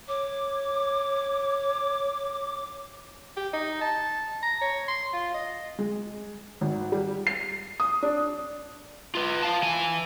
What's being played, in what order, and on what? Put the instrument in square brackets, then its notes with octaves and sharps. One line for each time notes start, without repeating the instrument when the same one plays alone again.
[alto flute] C#5 [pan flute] D6
[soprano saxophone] G4
D#4
A5
A#5
C#5
C6
F4
D#5
[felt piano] G#3
G#1
G3
C7
D#6
D4
[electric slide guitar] F4 B4
F4 F5 A5
E3 G#5